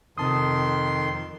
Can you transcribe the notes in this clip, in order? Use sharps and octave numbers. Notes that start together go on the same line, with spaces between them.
F2 C3 D#3 A5 C6 D#6